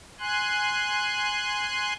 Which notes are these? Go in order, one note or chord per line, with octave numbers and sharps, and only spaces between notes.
G#5 C6 F#6